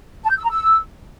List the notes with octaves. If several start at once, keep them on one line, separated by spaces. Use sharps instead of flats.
A5
G6
E6
A#5
E6